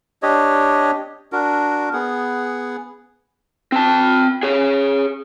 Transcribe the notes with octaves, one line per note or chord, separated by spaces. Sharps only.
D4 G4 C#5 D#5
D4 F#4 A#4
B3 G#4 F#5
C4 A5
G#4 C#5